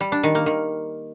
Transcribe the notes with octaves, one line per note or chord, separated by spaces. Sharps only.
G3
D4
D#3
A#3
D#3